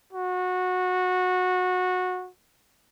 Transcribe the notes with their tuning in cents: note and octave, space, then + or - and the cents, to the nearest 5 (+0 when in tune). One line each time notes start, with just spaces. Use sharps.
F#4 -20